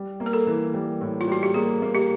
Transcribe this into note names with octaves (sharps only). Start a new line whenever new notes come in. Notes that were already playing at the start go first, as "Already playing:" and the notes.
Already playing: G3
A#3
A#4
A4
E3
G3
A2
F4
G3 F#4
G4
A#3 G#4
A#3
G4